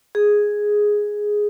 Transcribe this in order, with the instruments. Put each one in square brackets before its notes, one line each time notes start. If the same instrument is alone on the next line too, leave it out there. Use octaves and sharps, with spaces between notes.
[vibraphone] G#4